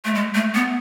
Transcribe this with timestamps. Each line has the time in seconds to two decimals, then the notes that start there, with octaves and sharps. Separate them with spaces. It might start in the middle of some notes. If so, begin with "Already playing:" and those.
0.05 A3
0.15 G#3
0.35 A3
0.55 B3